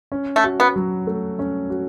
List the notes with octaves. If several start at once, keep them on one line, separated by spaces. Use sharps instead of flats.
C#4
A3
F#4
B3
F#3
A3
C#4
F#4